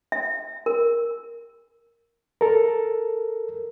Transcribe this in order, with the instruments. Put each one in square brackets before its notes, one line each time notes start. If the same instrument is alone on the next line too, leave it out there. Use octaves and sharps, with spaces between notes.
[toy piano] E5
A#4
[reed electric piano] A4 A#4